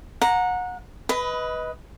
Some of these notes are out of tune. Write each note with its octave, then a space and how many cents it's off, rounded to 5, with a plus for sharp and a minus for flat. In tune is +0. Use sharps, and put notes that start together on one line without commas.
F#5 -25 A#5 +0
B4 +0 D#5 +20 B5 +20